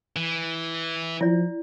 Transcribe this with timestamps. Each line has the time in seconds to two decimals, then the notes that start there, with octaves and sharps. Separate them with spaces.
0.16 E3
1.21 F3 E4 D5